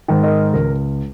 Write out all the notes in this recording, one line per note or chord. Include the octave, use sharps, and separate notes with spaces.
G#2 D#3
A#4 D#5
C#2 A#4